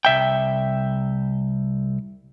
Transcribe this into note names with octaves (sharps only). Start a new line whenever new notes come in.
C2 E5 G5